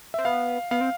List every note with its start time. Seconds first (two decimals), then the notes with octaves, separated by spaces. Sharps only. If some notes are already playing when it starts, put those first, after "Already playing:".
0.14 C4 E5
0.25 B3 F5
0.71 B3 F5
0.81 C4